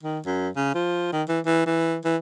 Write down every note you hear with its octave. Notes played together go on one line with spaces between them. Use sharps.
D#3
F#2
C#3
F3
D#3
E3
E3
E3
E3